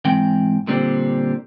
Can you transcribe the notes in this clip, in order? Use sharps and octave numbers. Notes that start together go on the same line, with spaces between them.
G#2 E3 C4 G5
A#2 D3 G3 C4